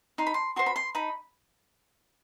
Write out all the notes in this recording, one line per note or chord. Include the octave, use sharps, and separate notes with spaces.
D#4 C6
B5
C6
F#4 C5 C6
B5
C6
D#4 B5